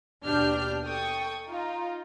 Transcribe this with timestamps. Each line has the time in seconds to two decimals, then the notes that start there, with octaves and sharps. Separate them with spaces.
0.24 D#2 B2 D4 G4 F6 G6
0.84 A4 G5 C#6 D#6
1.49 D#4 F4